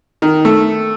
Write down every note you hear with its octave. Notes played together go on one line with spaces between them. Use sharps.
D#3
A3